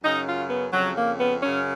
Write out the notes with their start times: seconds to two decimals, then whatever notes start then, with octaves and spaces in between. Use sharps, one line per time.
0.02 F#2 C#3 D#4
0.26 F4
0.49 B3
0.72 F2 C#3 F#3
0.96 A#3
1.19 B3
1.42 F#2 C#3 C#4